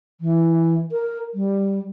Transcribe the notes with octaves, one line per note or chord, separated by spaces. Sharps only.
E3
A#4
G3